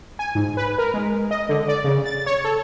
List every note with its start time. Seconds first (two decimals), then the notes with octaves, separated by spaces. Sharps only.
0.19 G#5
0.35 G#2
0.57 B4
0.78 A#4
0.94 G#3
1.31 D#5
1.49 D3
1.68 D5
1.84 C#3
2.06 A6
2.26 C#5
2.44 A4